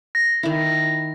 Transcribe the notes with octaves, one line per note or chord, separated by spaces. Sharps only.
A#6
D#3 E4